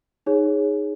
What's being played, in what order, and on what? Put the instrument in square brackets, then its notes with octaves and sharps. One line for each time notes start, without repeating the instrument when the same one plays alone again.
[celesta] D#4 G#4 C#5